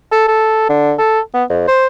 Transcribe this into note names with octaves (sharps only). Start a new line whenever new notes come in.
A4
A4
D3
A4
B3
F2
C5